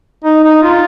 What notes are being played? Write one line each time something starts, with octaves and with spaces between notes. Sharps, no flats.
D#4
D#4
F4